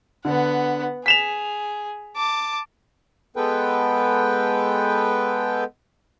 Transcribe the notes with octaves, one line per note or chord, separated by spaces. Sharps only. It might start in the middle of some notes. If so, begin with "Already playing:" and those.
D3 B3 F#5
G#4 B6 E7 F7
A5 D6
G#3 B3 A4 B4 G5